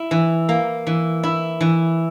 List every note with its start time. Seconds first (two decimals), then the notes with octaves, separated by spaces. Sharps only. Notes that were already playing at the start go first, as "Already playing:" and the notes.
Already playing: E4
0.11 E3
0.49 A#3
0.87 E3
1.23 E4
1.61 E3